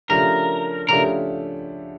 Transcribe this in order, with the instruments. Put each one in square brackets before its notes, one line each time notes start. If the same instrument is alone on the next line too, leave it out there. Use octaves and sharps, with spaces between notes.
[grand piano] C#3 F3 A3 D4 G4 [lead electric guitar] A#4
[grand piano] C#3 F3 A3 D4 G4 [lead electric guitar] A#4